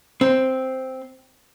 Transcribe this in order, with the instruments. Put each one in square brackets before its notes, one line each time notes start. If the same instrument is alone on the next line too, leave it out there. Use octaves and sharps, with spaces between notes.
[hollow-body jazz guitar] C4